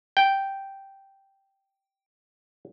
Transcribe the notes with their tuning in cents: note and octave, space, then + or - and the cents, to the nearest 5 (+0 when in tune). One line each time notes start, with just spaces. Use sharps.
G5 -5